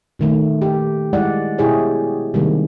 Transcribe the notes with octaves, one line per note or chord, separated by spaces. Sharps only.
A#2 D#3 A3
G4
G3 G#3 E4 D5 F#5
B2 E4 G4 G#4 C#5
C3 D#3 G3 G#3 A#3